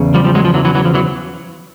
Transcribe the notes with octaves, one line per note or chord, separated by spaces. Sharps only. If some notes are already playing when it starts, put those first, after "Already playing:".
Already playing: E2 C#3
F3 G3
F3 G3
F#3 G#3
F3
E3 F#3
E3 F#3
E3 F#3
F3
E3 F#3